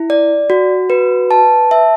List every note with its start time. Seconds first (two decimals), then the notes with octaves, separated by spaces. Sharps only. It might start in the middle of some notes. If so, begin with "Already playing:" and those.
Already playing: E4
0.10 D5
0.50 F#4
0.90 B4
1.31 A5
1.71 E5